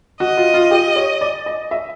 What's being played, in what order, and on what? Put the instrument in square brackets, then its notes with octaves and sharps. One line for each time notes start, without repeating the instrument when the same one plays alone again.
[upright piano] F#4 [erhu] D#5
[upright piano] F4
F4
G4
C#5
D5
D#5
E5